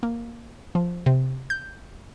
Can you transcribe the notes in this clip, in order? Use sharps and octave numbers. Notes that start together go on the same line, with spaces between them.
A#3
F3
C3
G6